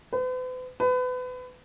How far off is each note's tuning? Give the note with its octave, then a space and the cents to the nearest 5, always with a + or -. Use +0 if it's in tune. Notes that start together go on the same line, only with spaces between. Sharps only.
B4 +45
B4 +30